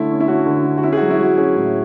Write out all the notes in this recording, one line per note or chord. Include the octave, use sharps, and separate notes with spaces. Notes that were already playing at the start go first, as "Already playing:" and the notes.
Already playing: D3 A3 C#4 E4
C#4
E4
C#4 F#4
D3
D3
F#4
C#4 E4
G#4
F#3 F#4
E4
F#3 F#4
C#4 G#4
A2